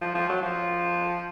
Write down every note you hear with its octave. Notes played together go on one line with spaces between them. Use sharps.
F3
F3
F#3
F3